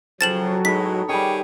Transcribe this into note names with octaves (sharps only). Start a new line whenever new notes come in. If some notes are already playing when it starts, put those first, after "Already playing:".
C#3 F3 F#3 A4 G5 A6 E7 F#7
A2 G#3 D#4 B4 B6
D#3 G3 G4 G#4 C#5